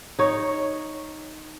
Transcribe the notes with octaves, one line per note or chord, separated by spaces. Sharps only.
D#4 C#5